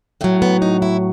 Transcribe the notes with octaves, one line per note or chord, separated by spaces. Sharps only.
A2 F#3 A3
B3
D#4
E4